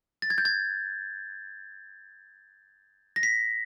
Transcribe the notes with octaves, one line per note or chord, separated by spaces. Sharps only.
A6
G#6
G6
G#6
A#6
B6